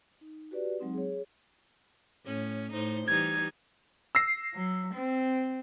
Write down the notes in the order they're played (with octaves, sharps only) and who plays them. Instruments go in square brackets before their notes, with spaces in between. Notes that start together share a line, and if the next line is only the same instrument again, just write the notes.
[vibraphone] D#4
F#4 G4 B4 D5
F#3 G#3 C4 D#4
G#4 C#5
[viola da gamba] A2 C#4
A2 D#4 C5
[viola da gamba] E3 G3 D#4 [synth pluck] G#6
[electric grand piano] E6 A#6 C7
[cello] F#3
C4